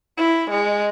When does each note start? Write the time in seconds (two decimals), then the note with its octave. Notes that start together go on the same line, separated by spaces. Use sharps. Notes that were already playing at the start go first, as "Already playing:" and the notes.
0.18 E4
0.51 G#3